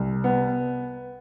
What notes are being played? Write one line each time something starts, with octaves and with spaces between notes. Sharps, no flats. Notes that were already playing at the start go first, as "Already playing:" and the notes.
Already playing: C2
B3